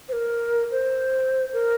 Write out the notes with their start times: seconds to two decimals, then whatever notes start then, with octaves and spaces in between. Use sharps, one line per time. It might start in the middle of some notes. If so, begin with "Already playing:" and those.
0.09 C5
0.13 A#4
0.71 C5
1.53 A#4